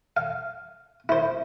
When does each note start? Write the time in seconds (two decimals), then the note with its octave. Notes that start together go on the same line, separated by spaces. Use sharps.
0.17 F5
1.09 E4 C5